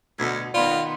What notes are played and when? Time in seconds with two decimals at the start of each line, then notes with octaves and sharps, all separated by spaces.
0.19 D2 B2 D3 G#6
0.54 D#3 B3 F4 D5 B5 C6